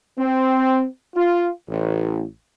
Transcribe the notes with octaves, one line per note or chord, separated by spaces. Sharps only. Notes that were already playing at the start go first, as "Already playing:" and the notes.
C4
F4
A1